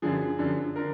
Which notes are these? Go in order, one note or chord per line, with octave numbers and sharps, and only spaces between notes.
F#2 D3 F3 G#4
F#2 D3 F3
D3 A#4